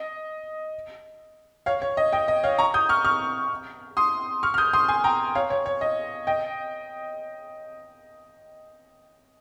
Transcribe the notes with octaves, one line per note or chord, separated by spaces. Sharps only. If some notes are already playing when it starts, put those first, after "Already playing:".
Already playing: D#5
C#5 F5
C#5
D#5
D#5 G5
D#5
C#5 F5
A#5 C#6
D#6 G6
C#6 F6
C#6 F6
C6 D#6
C#6 F6
F6
D#6 G6
C6 D#6
G#5 C6
G5 A#5
C#5 F5
C#5
C#5
D#5
D#5 G5